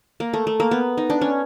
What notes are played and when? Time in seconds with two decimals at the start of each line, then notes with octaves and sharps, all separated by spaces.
0.20 A#3
0.33 A3
0.47 A3
0.60 A#3
0.71 B3
0.97 D#4
1.10 D4
1.21 C#4